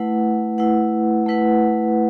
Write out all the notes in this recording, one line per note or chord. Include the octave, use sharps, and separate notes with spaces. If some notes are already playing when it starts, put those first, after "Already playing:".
Already playing: A3 E4 B4 F#5
A3 E4 B4 F#5
A3 E4 B4 F#5